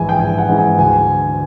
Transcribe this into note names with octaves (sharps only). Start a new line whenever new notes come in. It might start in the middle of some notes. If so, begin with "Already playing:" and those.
Already playing: A#1 G#2 E3 G#5
G5
A#1 G#5
F#5
G#2 E3
G#5
D2 G#5